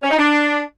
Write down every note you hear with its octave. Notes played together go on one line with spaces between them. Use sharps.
C#4
D#4
D4